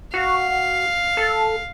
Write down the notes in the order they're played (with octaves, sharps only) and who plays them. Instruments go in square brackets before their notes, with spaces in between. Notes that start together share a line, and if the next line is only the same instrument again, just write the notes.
[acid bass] F#4 [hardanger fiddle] F5
[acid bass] A4